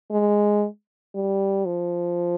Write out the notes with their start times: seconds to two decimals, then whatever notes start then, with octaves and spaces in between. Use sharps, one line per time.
0.11 G#3
1.15 G3
1.65 F3